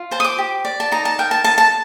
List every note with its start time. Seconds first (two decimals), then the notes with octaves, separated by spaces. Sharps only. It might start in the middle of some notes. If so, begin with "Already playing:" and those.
Already playing: F4
0.11 C5 A5
0.20 D#6
0.25 D6
0.38 G4
0.65 D5
0.80 A5
0.92 D#4 A#5
1.05 A5
1.19 A#4 G5
1.31 A5
1.44 D#4 A5
1.58 A5